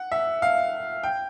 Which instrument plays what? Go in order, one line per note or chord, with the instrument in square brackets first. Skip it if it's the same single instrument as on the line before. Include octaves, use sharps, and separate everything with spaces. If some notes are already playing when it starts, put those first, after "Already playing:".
Already playing: [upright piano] F#5
E5
F5
G5